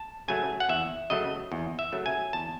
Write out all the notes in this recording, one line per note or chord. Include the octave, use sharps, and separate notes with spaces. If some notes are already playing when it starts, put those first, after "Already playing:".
Already playing: A5
C#3 F#3 A3 G#5
F#5
E2 E5
C#3 F#3 A3 D#5
E2
E5
C#3 F#3 A3
G#5
E2 A5